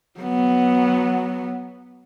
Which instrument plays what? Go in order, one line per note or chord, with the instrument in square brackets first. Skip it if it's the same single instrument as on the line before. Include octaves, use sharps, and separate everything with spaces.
[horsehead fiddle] F#3 B3